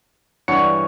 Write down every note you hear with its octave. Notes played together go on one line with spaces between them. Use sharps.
G2 E3 D4 C#5 F#5 C#7